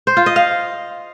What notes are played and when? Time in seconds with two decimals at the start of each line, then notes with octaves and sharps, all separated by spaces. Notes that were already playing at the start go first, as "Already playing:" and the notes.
0.07 C5
0.17 F4
0.26 D#5
0.36 F5